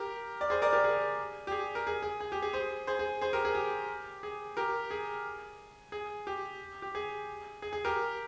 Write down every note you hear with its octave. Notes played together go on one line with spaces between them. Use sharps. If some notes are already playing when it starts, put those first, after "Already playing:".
Already playing: G4 A#4
D5
G#4 C5
A#4 D5
G4 A#4
G#4
G4
G#4
A#4
G#4
G#4
G#4
G4
G#4
G#4 C5
G#4 C5
G#4
G#4 C5
G4 A#4
G#4
G4
G#4
G4 A#4
G#4
G#4
G4
G4
G#4
G#4
G#4
G4 A#4